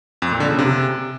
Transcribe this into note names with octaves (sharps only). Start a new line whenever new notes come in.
F2
A#2
D3
C#3
C3